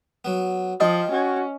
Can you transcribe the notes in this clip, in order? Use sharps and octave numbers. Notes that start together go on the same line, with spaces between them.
F#3 B3
F3 F4 D#5 G5 D#6
C#4 F#4